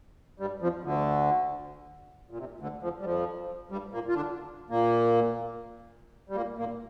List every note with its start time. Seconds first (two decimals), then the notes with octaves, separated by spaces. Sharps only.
0.40 G2 G3
0.62 F2 F3
0.83 D2 D3
2.30 A#2
2.38 C3
2.60 D2 D3
2.82 F2 F3
3.00 G3
3.05 F2 F3
3.71 G2 G3
3.93 A#2 A#3
4.08 F4
4.15 D3 D4
4.70 A#2 A#3
6.29 G3
6.35 A#2 A#3
6.58 A#2 A#3